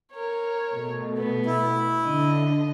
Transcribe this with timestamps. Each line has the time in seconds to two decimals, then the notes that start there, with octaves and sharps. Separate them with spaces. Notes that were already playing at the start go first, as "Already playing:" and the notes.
0.13 A#4 C#5
0.74 B2 A3
1.17 B3
1.46 E4
2.04 D3 D#5